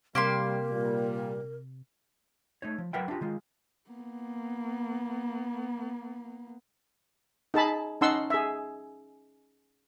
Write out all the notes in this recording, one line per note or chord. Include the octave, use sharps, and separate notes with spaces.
C3 G3 A#3 G4 A#4 C6
A#2 G3
A3 D#4 C#5
F3
F#3 A#4 B4 E5 F#5 G5
D4 F4 G4 G#4
D#3 G#3 F4
A#3 B3
D#4 G#4 A5 B5
C#4 D#4 F#5 A5 C6 E6
G#4 E5